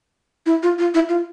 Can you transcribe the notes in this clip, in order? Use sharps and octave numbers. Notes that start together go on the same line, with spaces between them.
E4
F4
F4
E4
F4